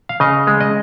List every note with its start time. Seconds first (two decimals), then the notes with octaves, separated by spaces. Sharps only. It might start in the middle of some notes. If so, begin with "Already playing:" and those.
0.09 F5
0.20 C#3 D#5
0.47 G#3
0.61 D#5